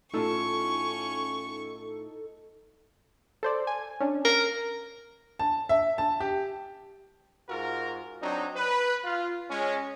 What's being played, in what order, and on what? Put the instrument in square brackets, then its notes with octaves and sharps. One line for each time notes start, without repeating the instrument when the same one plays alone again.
[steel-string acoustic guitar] A2 F4 A5 [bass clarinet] C#4 [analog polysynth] D#4 A4 [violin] C#6
[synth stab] A4 C5 D5
G#5
C#4 D4
[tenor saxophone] A#4
[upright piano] A5
E5
A5
G4
[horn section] G#2 F4 F#4 A#4
F#3 C4 D4 D#4
B4
F4
G#3 C#4